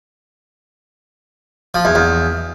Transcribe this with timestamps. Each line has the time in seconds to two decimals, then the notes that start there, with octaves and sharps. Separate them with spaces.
1.74 F3
1.85 E2
1.95 E2